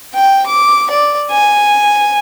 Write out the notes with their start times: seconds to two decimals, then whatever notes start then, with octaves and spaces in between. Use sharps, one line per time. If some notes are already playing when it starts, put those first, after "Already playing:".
0.14 G5
0.47 D6
0.90 D5
1.31 G#5